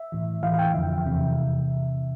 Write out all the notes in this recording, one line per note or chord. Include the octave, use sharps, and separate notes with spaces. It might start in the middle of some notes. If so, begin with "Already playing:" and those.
Already playing: E5
A2 E3
A2 E3 F5
F5
G5
F2 D3 F3 E5
E2 C3 E3